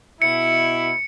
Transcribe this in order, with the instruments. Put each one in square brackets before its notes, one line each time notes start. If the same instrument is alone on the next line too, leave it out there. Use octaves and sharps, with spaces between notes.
[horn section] B2 E4 [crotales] C#7